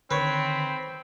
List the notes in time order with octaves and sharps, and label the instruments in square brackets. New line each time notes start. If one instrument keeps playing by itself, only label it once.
[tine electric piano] D3 D#3 [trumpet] C4 [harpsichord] B4 C#5 [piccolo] B5